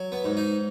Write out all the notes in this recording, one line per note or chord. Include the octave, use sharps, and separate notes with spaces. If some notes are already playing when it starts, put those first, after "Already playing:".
Already playing: F#3
B3
G#2
D#4